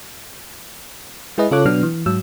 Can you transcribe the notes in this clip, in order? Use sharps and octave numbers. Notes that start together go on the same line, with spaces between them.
G#3 E4 G#4 B4 D#5
C#3 F4 A4 C#5 D6 F#6
B2 F#3 B3 D4 F6
E3
G#2 F#3 E6